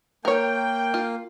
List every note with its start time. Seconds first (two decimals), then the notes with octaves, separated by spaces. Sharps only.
0.25 A#3 A#4 C#5 G5
0.94 F4